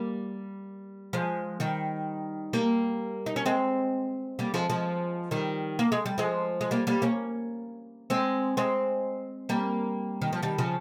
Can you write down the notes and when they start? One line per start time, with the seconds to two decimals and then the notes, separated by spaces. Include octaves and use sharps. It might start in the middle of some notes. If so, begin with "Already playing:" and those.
Already playing: G3 A#3
1.13 F3 G#3
1.60 D#3 G3
2.53 G3 A#3
3.26 D#4
3.36 C#4
3.46 G#3 C4
4.39 G3 A#3
4.54 F3 G#3
4.70 F3 G#3
5.31 D#3 G3
5.79 A#3
5.92 G#3
6.06 G3
6.18 F3 G#3
6.61 G#3
6.71 G3 A#3
6.87 G3 A#3
7.02 A#3 C#4
8.10 G#3 C4
8.57 G#3 C4
9.49 G3 A#3
10.22 D#3
10.33 F3
10.43 D#3 G3
10.58 C#3 F3